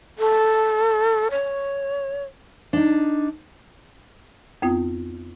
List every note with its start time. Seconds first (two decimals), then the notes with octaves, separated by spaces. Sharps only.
0.19 A4
1.31 C#5
2.73 D4 D#4
4.62 F2 B3 C4 F4 D#6